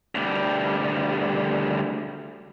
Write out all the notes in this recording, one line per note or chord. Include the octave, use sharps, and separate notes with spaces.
D2 G3